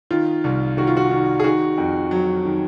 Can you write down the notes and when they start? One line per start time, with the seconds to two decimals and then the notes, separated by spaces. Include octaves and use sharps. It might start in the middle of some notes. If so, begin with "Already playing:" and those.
0.11 D#3 F4
0.44 C2
0.77 D#3 F#4
0.87 F4
0.97 F#4
1.11 D#3
1.40 G#4
1.44 D#3 F#4
1.78 F2
2.11 F#3
2.45 D#3